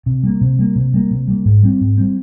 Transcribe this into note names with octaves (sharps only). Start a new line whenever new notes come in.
C3
G3 A#3
C3
G3 A#3
C3
G3 A#3
C3
G3 A#3
G#2
G3 C4
G#2
G3 C4